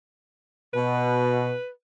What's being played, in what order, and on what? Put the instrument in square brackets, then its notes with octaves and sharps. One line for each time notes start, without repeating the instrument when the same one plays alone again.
[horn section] B2 [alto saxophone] B4